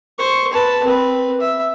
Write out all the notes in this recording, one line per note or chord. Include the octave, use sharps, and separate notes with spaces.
C5 C#6
B4 A5
C4 B4
E5